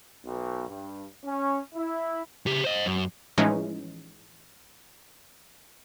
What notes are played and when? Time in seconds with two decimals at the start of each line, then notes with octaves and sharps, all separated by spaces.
0.24 B1
0.67 G2
1.24 C#4
1.74 E4
2.46 C#3 G4
2.64 C5 D#5
2.86 F#2
3.38 A2 E3 F3 G#3 C#4 D#4